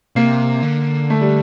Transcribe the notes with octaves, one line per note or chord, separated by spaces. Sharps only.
C3 A#3
D3
A3
G3